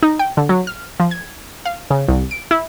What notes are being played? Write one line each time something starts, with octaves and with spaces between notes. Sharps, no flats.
D#4
G5
D3
F#3
F6
F3
G#6
F5
C#3
C2
D7
E4